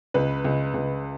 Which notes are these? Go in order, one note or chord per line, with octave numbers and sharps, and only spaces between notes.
C#2 B4
C#2
C#2